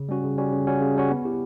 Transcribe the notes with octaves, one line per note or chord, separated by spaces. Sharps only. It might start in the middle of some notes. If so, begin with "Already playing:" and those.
Already playing: C#3
G3 C#4 F#4
C#3
G3 C#4 F#4
C#3
G3 C#4 F#4
C#3
G3 C#4 F#4
B3
E4 G4